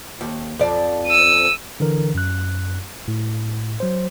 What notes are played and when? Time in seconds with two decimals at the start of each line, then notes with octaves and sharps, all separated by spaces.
0.21 D#2
0.59 F2 D5
1.07 E6 D#7
1.80 D3 E3 A#4
2.15 F#2 F#6
3.08 A2
3.80 F#3 C5